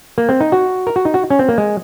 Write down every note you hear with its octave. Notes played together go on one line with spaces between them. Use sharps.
A#3
C4
D#4
F#4
A#4
F#4
D#4
F#4
C#4
C4
A#3
G#3